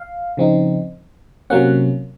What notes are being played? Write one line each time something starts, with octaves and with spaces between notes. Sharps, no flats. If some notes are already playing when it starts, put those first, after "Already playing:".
Already playing: F5
C#3 F3 C4 D#4
C3 F#3 A#3 C#4 F#5